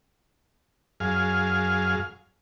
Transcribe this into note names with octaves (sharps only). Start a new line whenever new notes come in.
F#2 G#4 F5